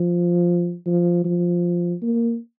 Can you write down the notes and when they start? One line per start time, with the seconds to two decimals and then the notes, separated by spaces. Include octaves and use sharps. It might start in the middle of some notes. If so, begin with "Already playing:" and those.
Already playing: F3
0.86 F3
1.25 F3
2.02 A#3